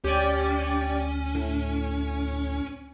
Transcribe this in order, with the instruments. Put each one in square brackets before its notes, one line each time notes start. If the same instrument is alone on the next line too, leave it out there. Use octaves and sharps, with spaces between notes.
[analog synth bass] D2 [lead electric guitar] C#4 [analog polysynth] G4 D5
[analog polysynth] A2